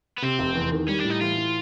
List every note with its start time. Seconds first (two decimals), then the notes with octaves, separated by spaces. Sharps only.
0.18 B3
0.22 C3 C4
0.39 F1
0.55 E2
0.72 D#3
0.88 G3 C#4
0.99 D4
1.04 A2
1.10 D#4
1.21 E3 F4
1.38 A2